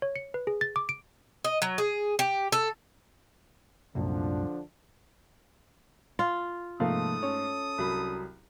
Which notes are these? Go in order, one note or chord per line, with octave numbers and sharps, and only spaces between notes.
C#5
C#7
B4
G#4
A6
D6
D7
D#5
F#3
G#4
G4
A4
C2 F#2 A#2 D3 F3 D4
F4
G#2 C3 F3 A3 A#3 A4 F5 D#6
C#4 C#5
C2 F#3 B5